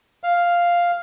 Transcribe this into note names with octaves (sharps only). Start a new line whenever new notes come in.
F5